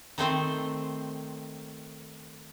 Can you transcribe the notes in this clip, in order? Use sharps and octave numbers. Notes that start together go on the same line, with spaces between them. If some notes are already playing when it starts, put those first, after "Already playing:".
D#3 A3 C4 C5